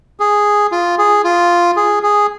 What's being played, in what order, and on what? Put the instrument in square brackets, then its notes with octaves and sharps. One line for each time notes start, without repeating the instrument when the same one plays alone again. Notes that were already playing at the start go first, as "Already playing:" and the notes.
[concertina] G#4
F4
G#4
F4
G#4
G#4